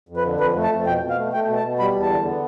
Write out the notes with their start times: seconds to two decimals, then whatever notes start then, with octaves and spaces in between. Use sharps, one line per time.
0.09 F2
0.17 B4
0.25 D3
0.40 F2 B4
0.56 A3
0.63 A5
0.71 F2
0.87 B2 G5
1.02 B2
1.10 F5
1.18 A3
1.33 A3 G5
1.48 B2
1.57 A5
1.64 B2
1.79 G3 B5
1.95 E2
2.02 A5
2.10 D3
2.26 B3